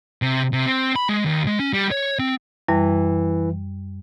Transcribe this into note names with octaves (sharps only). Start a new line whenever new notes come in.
C3
C3
C4
B5
G#3
D#2
G#3
C#4
G3
C#5
C4
F#2 E3 G3